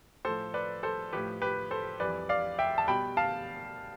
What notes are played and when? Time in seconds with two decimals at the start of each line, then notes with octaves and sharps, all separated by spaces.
0.25 A2 A4 C5
0.29 F3
0.54 B4 D5
0.83 A4 C5
1.13 A2 F3 G4 B4
1.42 G4 B4
1.71 A4 C5
2.00 F2 E3 G3 B4 D5
2.29 D5 F5
2.59 E5 G5
2.78 A5
2.88 B2 G3 G5 B5
3.17 F5 A5